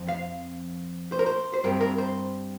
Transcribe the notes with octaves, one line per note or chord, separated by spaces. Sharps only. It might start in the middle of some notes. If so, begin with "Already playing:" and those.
Already playing: F2 F3 C4
F5
C5
A#4
C5
C5
G2 G3 C4 A#4
A#4
C5